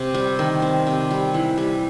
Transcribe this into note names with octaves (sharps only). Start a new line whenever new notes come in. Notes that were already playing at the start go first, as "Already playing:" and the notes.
Already playing: C3
G3
D#3
C4
C3
G3
E3
G3